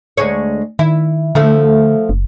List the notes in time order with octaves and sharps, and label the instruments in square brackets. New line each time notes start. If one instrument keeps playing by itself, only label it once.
[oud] D2 G#3 C#5
[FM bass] D#3 [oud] E4
[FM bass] D3 [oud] F3 A3
[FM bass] F#1